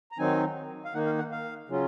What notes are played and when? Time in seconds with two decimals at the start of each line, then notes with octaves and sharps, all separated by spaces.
0.12 A#5
0.19 D#3 F#3 C4 D#4 G#5
0.85 F5
0.94 D#3 A#3 D#4 F#5
1.06 F5
1.18 F#5
1.32 F5
1.69 C#3 F#3 C#4 F4